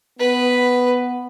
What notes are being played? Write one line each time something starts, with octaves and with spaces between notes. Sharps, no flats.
B3 B4